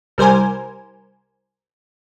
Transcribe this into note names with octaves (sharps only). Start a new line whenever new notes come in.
C2 G3 A#4 C5 G#5